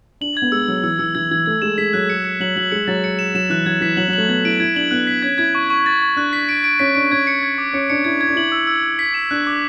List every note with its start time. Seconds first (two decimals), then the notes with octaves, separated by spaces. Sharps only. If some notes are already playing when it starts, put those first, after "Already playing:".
0.21 D4 F#7
0.37 G#6
0.42 B3
0.52 G#3 E6
0.68 F#3 E6
0.83 E3 E6
0.99 E3 E6
1.15 E3 G#6
1.31 E3 G#6
1.46 A3 G#6
1.62 G#3 E7
1.78 G#3 B6
1.93 F#3 F#6
2.10 C#7
2.25 C#7
2.40 F#3 F#7
2.56 F#3 F#7
2.72 G#3 C#7
2.88 F#3 A6
3.04 C#7
3.19 E7
3.35 F#3 E7
3.50 E3 F#6
3.66 F#3 G#6
3.81 E3 B6
3.97 F#3 F#7
4.08 F#3
4.13 A3 F#7
4.28 B3 G#6
4.45 E4 D7
4.60 E4 G#6
4.76 D4 F#7
4.91 B3 F#6
5.07 B6
5.22 C#4 G#6
5.38 E4 G#6
5.55 C#6
5.70 C#6
5.86 A6
6.02 C#6
6.16 D4 F#6
6.33 B6
6.49 D7
6.64 D7
6.79 C#4 B6
6.95 D4 D7
7.11 C#4 G#6
7.27 C#7
7.43 G#6
7.58 D6
7.73 C#4 C#7
7.90 D4 C#7
8.04 E4 G#6
8.21 G#6
8.28 D4
8.36 E4 F#7
8.52 E6
8.67 E6
8.83 E6
8.99 B6
9.14 E7
9.31 D4 F#6
9.47 D6